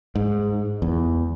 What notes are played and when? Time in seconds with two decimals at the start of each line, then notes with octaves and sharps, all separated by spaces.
0.15 G#2
0.82 E2